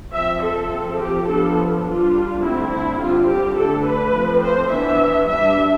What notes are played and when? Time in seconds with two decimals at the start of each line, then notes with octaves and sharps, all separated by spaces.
0.13 F3 C4 E5
0.42 A4
0.70 F3 C4
0.99 G4
1.27 F3 B3 D4 A4
1.85 G3 D4 F4
2.42 D3 A3 C4 E4
2.71 E4
2.99 D3 G3 C4 F4
3.28 G4
3.56 D3 A3 D4 A4
3.85 B4
4.14 F3 A3 C4
4.43 C5
4.71 E3 B3 D4 E5
5.28 G3 D4 E5